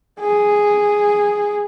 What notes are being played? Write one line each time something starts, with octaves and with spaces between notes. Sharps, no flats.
G#4